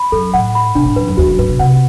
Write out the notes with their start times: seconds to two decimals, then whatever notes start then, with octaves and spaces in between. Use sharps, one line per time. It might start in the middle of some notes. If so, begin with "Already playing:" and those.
Already playing: B5
0.12 F#2 A4
0.34 A2 F#5
0.55 B5
0.75 B2 D4
0.85 A2
0.96 F#2 B4
1.08 F#2
1.17 E2 F#4
1.28 F#2
1.39 A2 B4
1.49 B2
1.59 C3 F#5